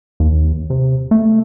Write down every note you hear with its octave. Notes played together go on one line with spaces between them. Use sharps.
D#2
C3
A3